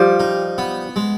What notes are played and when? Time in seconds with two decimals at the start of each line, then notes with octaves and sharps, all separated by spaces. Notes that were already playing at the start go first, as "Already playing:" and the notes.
Already playing: F3 G3 G4
0.20 D#4
0.58 B3
0.96 G#3